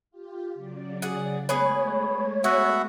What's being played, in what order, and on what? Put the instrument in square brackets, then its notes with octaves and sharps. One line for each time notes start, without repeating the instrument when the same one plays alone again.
[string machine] F4 G4
C#3 F#3 D5
[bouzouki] G#4 F#5
[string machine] G#3 A3 [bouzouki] B3 G#4 B4 [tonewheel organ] C#5
[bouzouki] B3 G#5 [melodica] F#4 E5 F#5